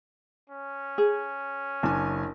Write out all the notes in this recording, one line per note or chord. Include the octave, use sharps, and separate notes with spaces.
C#4
G#4
F#1 D4 G#5 A5